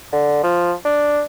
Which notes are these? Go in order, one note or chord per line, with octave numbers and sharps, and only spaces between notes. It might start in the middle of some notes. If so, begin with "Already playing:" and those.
D3
F3
D4